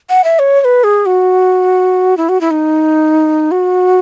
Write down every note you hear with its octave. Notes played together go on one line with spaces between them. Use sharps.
F#5
E5
C#5
C#5
B4
G#4
F#4
E4
F#4
E4
D#4
F#4